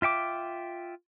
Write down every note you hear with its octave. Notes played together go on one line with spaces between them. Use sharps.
F4 E5 G5 D6